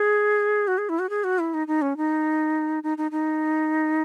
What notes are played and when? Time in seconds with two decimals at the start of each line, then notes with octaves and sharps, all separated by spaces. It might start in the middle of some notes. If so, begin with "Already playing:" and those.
Already playing: G#4
0.68 F#4
0.78 G#4
0.89 E4
0.99 F#4
1.10 G#4
1.24 F#4
1.39 E4
1.54 D#4
1.67 D#4
1.82 C#4
1.97 D#4
2.83 D#4
2.98 D#4
3.11 D#4